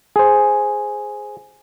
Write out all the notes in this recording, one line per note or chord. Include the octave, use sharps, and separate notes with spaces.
G#4 C5